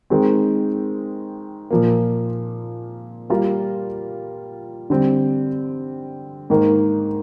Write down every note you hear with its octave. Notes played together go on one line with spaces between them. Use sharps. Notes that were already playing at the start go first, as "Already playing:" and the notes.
D#3 G#3 C4
A#2 F3 A#3
G3 A#3 F4 A#4
D3 G3 C4
G#2 D#3 A#3